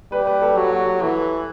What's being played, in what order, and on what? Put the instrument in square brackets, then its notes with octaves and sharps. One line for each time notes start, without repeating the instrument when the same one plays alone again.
[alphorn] G3 [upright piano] B4
[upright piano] B4
A4
[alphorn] F#3 [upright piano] G4
[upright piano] F#4
G4
[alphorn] E3 [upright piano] A4